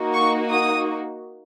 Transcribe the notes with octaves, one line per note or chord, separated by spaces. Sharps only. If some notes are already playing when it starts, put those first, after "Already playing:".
Already playing: A#3 D#4 F#4
C#6
D#6